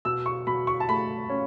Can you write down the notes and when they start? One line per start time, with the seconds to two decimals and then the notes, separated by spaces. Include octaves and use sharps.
0.05 B2 E6
0.26 C#6
0.47 B2 B5
0.67 C#6
0.80 A5
0.89 A3 B5
1.29 C#4